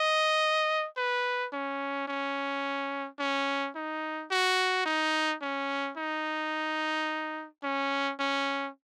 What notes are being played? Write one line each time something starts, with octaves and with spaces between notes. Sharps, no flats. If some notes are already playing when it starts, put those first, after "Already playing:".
Already playing: D#5
B4
C#4
C#4
C#4
D#4
F#4
D#4
C#4
D#4
C#4
C#4